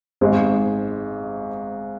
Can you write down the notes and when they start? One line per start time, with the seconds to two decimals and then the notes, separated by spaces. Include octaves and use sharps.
0.21 G#1 G#2 G#3